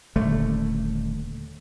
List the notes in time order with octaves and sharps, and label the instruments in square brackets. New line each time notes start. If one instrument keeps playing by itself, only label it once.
[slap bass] D#1 D3 A3